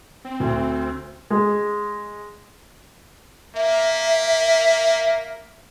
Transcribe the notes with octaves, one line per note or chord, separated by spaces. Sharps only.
C4
D2
G#3
A#3 E5